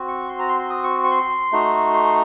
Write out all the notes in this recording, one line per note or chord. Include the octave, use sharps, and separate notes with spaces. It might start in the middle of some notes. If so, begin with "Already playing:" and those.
Already playing: C4 F#4
C#6
C6
A#5
C6
C6
D#6
C#6
C#6
C6
A3 D#4 F#4
C6